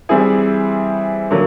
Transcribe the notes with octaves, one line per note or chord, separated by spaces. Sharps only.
E3 G3 C4 E4 G#4
D3 F#3 A#3